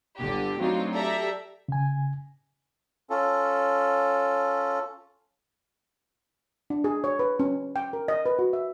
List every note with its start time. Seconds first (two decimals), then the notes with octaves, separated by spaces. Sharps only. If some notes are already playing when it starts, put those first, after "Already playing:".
0.18 G1 D3 G4
0.59 F#3 A3 C4 D4 D#4 F4
0.93 G4 A4 D5 E5 A#5
1.68 C#3 G#5
3.10 C#4 F4 A4
6.70 D4
6.84 G#4
7.04 C#5
7.19 B4
7.40 C#4
7.76 G5
7.93 A#4
8.08 D#5
8.26 B4
8.39 F#4
8.53 E5